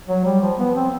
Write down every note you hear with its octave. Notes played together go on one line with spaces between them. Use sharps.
F#3
G3
F3
B3
C4